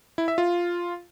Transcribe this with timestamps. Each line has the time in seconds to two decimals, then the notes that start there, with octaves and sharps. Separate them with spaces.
0.18 E4
0.28 E5
0.38 F4